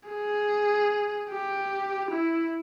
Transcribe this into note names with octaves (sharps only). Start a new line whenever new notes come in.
G#4
G4
E4